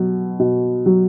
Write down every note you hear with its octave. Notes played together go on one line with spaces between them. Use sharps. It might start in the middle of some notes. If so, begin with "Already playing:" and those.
Already playing: B2 F#3
B2
F#3